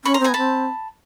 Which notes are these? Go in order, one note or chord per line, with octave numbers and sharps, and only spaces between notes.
C#4 B5 C#6
A#5 C6
C4
G#5 A#5
B3
C4 A5 B5